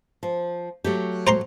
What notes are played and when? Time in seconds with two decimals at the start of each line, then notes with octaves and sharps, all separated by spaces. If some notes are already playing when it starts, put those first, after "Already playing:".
0.23 F3
0.84 F#3 A3 G4
1.27 C5 A#5 C6